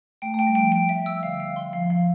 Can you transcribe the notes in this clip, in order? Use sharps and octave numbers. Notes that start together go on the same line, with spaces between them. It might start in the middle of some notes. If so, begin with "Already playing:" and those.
A3 G5
A3
G5
G3
F3 G5
G5
E5
E6
D3 F5
F5
D3
C6
F3 F5
F3 F5